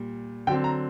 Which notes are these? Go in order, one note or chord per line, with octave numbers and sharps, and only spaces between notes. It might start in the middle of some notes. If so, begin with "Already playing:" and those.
Already playing: A#2 G3
D3 F#3 C4 G5
A#5